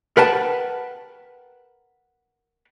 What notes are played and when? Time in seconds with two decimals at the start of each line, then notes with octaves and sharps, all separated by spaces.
0.17 A#4 B4 F#5 G5 A5